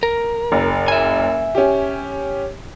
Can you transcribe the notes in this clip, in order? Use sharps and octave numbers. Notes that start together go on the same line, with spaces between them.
A#4
F#1
E5 G#5
C#4 G4